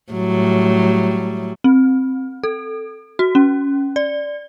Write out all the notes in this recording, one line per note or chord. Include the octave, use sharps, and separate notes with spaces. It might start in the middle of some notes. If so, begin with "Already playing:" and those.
A2 F#3 G3
C4
A4
F#4
C#4
D5